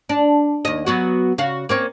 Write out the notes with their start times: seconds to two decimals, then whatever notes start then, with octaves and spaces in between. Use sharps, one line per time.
0.09 D4
0.65 D#2 D#5
0.86 F#3 B3 F#4
1.38 C#3 F#4 F5
1.69 A#3 C4 C#4